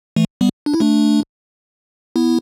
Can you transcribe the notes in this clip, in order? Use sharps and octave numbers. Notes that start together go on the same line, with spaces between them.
E3 A3
G3 B3
D4
E4
A3 D4
B3 E4